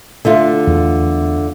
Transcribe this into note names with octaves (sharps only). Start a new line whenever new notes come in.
D3 A3 F4
E2